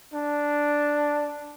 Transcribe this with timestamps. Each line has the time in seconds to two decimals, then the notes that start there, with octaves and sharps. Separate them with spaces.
0.13 D4